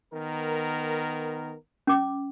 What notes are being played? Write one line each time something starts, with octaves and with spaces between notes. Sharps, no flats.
D#3 B3 A#4
C#4 D6